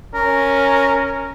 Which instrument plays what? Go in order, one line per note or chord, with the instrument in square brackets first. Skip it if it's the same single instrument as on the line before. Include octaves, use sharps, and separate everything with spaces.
[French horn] C#4 [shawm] A#4